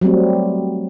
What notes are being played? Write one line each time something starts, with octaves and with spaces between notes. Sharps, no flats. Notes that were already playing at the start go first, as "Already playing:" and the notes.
F#3 G3 A3 C4